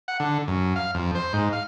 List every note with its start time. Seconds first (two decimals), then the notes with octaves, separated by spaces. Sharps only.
0.08 F#5
0.20 D3
0.48 F#2
0.76 F5
0.95 F2
1.15 C5
1.33 G#2
1.53 F5